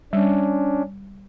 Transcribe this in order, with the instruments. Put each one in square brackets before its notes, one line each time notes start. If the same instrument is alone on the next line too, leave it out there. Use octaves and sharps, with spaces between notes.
[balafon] G3 [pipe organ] C#4 D4